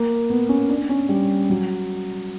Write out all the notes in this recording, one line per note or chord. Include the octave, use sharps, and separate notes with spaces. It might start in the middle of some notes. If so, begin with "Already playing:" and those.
Already playing: A#3
B3
C#4
D4
C#4
G3
F#3